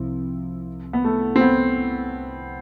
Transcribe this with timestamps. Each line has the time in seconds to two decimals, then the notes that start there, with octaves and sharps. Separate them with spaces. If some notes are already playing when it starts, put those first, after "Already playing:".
Already playing: C2 C3 F3 C4 E4
0.93 B3
1.04 A3
1.36 C4
1.41 B3